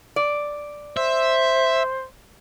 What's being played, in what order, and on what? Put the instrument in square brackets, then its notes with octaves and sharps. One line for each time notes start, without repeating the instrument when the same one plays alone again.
[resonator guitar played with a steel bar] D5
[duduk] C5 [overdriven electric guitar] E5